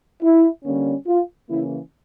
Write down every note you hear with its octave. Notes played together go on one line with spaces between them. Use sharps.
E4
D3 G3 A#3 C#4
F4
C#3 E3 A#3 C#4 E4